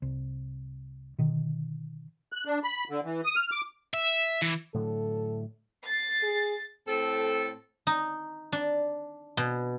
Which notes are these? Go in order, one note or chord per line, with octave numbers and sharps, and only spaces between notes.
C2
B2 D3 D#3
F#6
D4
B5
D3
E3
D#6
F6
D6
E5
E3
A2 D3 F#3 A4
A6 C7
G#4
A2 C4 A4
D#4
D4
B2